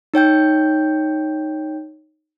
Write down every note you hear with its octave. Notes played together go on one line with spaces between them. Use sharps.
D#4 C#5 G5 G6